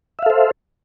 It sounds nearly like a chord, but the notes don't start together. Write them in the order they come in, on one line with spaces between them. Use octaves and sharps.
E5 F5 A4 C5